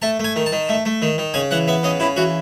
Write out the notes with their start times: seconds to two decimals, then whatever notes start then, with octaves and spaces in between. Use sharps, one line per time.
0.02 A3 A5
0.19 A3 G#5
0.36 D#3
0.46 A5
0.52 D#3
0.69 A3
0.85 A3
1.02 D#3
1.18 D#3
1.34 C#3 G#5
1.51 E3 F#5
1.68 B3 E5
1.83 C#3 D#5
2.00 C#3 E4
2.16 E3 F#4